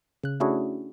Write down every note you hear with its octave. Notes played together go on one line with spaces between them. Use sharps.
C#3 F#6
A3 C#4 D4 E4 F#4 G#4